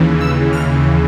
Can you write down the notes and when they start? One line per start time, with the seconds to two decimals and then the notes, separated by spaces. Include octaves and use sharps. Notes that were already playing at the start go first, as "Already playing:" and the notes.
Already playing: D#2 C#3 E3
0.21 E6
0.53 F6